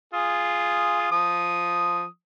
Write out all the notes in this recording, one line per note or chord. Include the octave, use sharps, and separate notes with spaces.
F4 G#4 D#6
F3 D#6